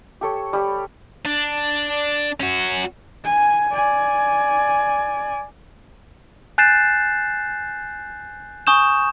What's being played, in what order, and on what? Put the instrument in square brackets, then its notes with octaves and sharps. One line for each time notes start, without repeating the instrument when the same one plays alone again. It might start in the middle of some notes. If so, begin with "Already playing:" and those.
[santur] G4 A4 C#5
G3 G4
[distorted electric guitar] D4
C#4 F#4
[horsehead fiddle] G#5
D5 G#5
[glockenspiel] G#5 F#6 G6 A6 C7 E7
G#5 C#6 D#6 G6 E7